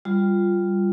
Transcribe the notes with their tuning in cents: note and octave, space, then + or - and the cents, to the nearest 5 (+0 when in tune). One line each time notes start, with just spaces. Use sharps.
G3 +0 F4 +0